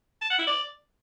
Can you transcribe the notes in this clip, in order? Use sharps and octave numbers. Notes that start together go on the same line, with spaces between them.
A5
F#5
E4
D5